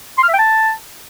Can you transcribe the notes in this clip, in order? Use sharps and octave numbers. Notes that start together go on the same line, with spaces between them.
C6
F6
E5
G5
A5